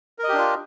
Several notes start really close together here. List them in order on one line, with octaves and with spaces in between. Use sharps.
A#4 D#5 G4 D4 F4